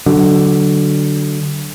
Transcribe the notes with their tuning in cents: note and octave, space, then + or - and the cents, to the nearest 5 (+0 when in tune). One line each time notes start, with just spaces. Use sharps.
D3 +0 F#3 +20